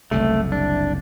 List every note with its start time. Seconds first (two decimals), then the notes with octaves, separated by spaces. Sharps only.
0.11 F#1 C2 C3 A3
0.52 D4